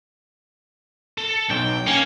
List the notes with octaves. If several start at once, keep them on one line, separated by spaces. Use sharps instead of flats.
A4
B1 G5
A#3 C#4